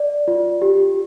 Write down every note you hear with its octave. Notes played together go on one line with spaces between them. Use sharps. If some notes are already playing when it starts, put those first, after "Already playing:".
Already playing: D5
F4
G4